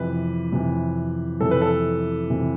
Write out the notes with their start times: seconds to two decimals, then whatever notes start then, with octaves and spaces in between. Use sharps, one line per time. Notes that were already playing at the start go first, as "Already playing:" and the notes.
Already playing: F2 C3 E3 B4
0.52 F2 C3 E3
1.41 F2 C3 E3 A4
1.51 B4
1.62 A4
2.29 F2 C3 E3